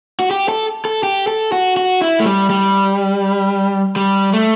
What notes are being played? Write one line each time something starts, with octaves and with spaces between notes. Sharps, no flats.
F#4
G4
A4
A4
G4
A4
F#4
F#4
E4
A3
G3
G3
G3
A3